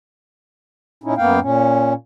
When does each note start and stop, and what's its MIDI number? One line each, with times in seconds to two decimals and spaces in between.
1.04 1.14 46
1.04 1.14 61
1.04 1.14 63
1.04 1.14 64
1.17 1.40 42
1.17 1.40 58
1.17 1.40 59
1.17 1.40 77
1.17 1.40 79
1.41 1.93 46
1.41 1.93 61